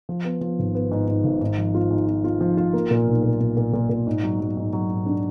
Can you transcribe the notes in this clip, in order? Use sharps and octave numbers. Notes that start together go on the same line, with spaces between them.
F3
B3
F3
G#1
B3
G#2
G#2
G#1
G#2
F3
F4
G#2
F4
F4
F3
F4
A#3
A#2
B1
A#2
A#2
A#2
A#2
A#2
G#2
F#3
F#3
G#2
F#3
G#2
D4